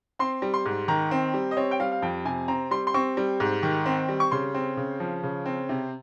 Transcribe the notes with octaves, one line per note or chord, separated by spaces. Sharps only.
C4 C6
G3
C6
G#2
D#3 A#5
C4
G3
D#5
C4 C#5
G5
G3 F5
F5
F2 G5
C3 G#5
C4 A#5
G3 C6
C6
C4 C#6
G3
G#2
D#3
C4
G3
C#6
C#3 C6
C4
C#3
F3
C#3
C4
C3